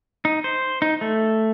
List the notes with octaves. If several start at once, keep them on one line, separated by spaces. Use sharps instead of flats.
D#4
C5
D#4
A3